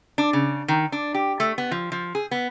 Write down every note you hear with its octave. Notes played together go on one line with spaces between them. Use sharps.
D4
C#3
D#3
D4
G4
A3
B3
F3
F3
G#4
B3